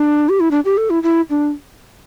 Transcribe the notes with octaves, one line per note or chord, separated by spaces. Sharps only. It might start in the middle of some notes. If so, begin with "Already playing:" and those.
Already playing: D4
G4
E4
D4
G4
A4
E4
E4
D4